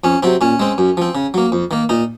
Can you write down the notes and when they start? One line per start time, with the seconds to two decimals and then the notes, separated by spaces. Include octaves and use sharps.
0.04 F2 C#4
0.23 C3 F#3 C4
0.41 A#2 C#4
0.60 G#3 C4
0.78 F#2
0.97 F3 C4
1.15 C#3
1.34 F#3 A#3
1.52 F2
1.71 D#3 A#3
1.89 A#2 D#4